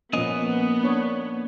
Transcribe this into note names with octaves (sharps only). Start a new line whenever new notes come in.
A#2 F3 A#3 B3 C#4 D#5
D4 C#5